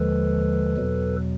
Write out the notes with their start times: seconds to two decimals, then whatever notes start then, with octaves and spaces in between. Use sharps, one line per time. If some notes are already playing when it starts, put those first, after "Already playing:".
Already playing: D#2 D3 F3 G#3 A4 B4
0.77 E2 B2 F#3